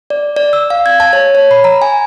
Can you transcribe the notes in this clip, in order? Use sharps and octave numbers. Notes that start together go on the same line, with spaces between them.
D5
D5
E6
F5
G#6
A5
C#5
C#5
B5
A#5
G#5